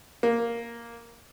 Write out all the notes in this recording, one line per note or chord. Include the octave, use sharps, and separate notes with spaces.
A#3